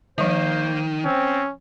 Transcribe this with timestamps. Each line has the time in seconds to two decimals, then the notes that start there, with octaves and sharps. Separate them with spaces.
0.18 D#3 F3 G3 A#3 C5
1.04 C4 C#4